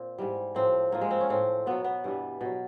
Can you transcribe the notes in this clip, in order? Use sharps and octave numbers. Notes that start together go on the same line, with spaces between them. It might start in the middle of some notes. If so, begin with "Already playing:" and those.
Already playing: A#2 C4
G#2 E3 G3
A2 F3 C4
G#2 F3 A#3
G#3
C4
C#4
A2 F3 C4
B2 F#3 B3
B3
G2 E3 G3
B2 F#3